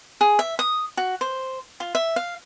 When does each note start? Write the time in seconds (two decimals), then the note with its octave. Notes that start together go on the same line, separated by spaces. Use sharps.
0.21 G#4
0.39 E5
0.59 D#6
0.97 F#4
1.21 C5
1.80 F4
1.95 E5
2.16 F5